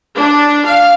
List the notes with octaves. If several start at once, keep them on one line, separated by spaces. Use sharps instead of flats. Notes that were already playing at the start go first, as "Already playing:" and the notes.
D4
F5